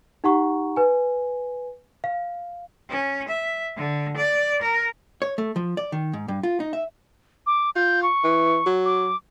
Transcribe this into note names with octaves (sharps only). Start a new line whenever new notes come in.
D#4 G4 F#5 A#5 C#6
B4 G#5
F5
C#4
E5
D3
D5
A#4
C#5
A3
F3
D5
D#3
G#2
G2
F4
D#4
E5
D6
F4 G6
C#6
E3
F#3
D6